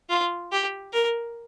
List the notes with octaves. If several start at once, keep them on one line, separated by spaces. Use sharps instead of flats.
F4
G4
A#4